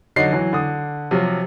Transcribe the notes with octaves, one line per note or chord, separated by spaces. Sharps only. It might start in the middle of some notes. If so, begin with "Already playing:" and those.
D3 F#3 D#4 C7
E3 F#3
D3 D#6
C3 F3 F#3